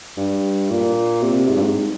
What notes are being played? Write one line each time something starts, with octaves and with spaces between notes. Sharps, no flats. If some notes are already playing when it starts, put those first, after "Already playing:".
G2
A#2
C3
G#2
G2
G#2